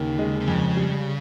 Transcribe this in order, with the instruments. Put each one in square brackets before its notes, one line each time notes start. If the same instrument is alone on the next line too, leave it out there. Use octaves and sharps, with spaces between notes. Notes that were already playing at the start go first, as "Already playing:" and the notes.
Already playing: [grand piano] D#2 [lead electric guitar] C#3
[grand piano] G#3
[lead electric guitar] C3
[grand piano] F2 [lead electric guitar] C#3
[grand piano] G3